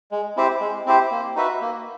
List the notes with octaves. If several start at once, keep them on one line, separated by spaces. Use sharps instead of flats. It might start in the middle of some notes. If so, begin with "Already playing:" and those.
G#3
C4 E4 G4 C5
G#3
C4 E4 G4 C5
A#3
D#4 F#4 B4 E5
A#3